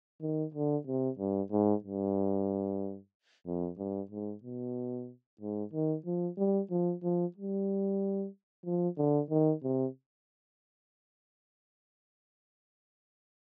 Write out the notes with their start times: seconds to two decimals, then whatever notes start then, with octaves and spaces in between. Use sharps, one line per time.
0.22 D#3
0.54 D3
0.87 C3
1.19 G2
1.52 G#2
1.84 G2
3.47 F2
3.78 G2
4.11 G#2
4.43 B2
5.41 G#2
5.73 D#3
6.06 F3
6.38 G3
6.71 F3
7.03 F3
7.36 G3
8.66 F3
8.98 D3
9.30 D#3
9.63 C3